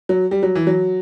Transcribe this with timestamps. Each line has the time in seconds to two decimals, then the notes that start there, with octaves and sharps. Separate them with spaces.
0.09 F#3
0.31 G3
0.43 F#3
0.55 E3
0.67 F#3